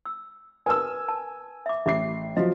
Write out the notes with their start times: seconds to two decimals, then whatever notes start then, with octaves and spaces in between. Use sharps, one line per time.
0.06 E6
0.66 A#4 B4 G#5 A5 E6
1.08 A5
1.66 E5 D6
1.86 A1 E5 D6 C7
2.37 F3 F#3 D#5